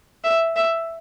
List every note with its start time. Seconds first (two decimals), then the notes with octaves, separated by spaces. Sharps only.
0.24 E5
0.56 E5